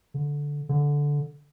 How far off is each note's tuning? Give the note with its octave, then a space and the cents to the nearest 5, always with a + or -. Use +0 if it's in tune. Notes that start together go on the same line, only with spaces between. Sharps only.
D3 -10
D3 -10